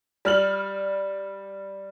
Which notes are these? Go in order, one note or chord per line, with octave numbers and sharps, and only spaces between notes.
G3 F6 F#7